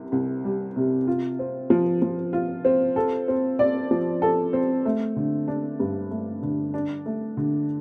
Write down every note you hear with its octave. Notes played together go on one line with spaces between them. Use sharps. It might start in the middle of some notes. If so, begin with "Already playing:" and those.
Already playing: C2 C3
C2
G3
C3
F4
C4
F3
F3
F4
C4
A4
C4
D5
F3
A4
C4
A3
D3
D4
G2
A3
D3
D4
A3
D3